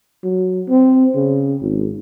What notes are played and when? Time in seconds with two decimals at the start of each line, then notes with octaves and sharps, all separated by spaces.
0.23 F#3
0.69 C4
1.15 C#3
1.61 G#1